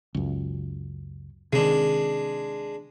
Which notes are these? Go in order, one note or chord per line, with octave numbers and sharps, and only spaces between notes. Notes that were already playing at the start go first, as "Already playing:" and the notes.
C#2 F#2
C3 D#3 G#3 D4